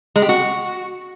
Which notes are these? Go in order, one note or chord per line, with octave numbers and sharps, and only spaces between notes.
G#3
G4
F#4